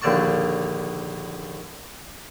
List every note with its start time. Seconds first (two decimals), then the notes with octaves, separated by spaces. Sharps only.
0.02 A#1 D#2 D3 F#5 A5 C#6